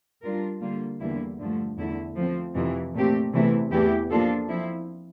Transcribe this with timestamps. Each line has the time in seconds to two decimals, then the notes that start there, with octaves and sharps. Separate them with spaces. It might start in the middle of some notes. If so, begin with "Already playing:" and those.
0.23 G3 D4 F4 A#4
0.61 D3 G3 A#3 F4
0.99 E2 D3 G3 A#3 E4
1.38 G2 D3 F3 A3
1.77 E2 D3 A3 E4
2.16 F3 A3 C4
2.54 F2 C3 E3
2.94 A#2 A3 C4 G4
3.33 E2 C3 E3 A3 E4
3.71 E2 E3 A3 E4 G4
4.10 F3 A#3 D4 F4 A4
4.48 F3 C4 E4